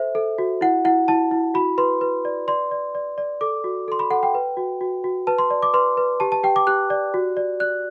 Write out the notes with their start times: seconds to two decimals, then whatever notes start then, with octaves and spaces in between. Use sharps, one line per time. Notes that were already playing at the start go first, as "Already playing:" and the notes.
Already playing: A4 C5 E5
0.15 A4
0.38 F#4
0.61 E4 F#5
0.85 E4 F#5
1.08 E4 A5
1.31 E4
1.54 F#4 B5
1.78 B4 C6
2.01 B4
2.25 D5
2.48 D5 C6
2.71 D5
2.95 D5
3.18 D5
3.41 A4 D6
3.64 F#4
3.88 A4 C6
3.99 B5
4.10 A4 F#5
4.23 G5
4.35 B4
4.57 F#4
4.81 F#4
5.04 F#4
5.27 B4 A5
5.38 C6
5.50 D5
5.62 D6
5.74 B4 C6
5.97 B4
6.20 G4 A5
6.32 A5
6.43 G4 G5
6.56 D6
6.67 G4 F#6
6.90 D5
7.14 F#4
7.37 D5
7.60 D5 F#6